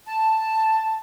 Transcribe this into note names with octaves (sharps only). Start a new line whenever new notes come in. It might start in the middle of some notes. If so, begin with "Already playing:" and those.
A5